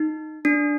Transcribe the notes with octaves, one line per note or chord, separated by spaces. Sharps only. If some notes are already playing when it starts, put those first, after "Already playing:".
Already playing: D#4
D4